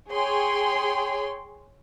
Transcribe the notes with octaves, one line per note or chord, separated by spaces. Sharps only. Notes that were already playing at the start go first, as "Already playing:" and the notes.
G#4 C#5 G5 C6